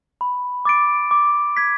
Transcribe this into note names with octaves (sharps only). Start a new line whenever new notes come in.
B5
D6 A6 D7
D6
G#6 B6